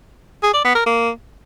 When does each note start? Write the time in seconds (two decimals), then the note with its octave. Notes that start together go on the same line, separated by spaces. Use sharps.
0.43 G#4
0.54 D5
0.65 B3
0.75 A#4
0.86 A#3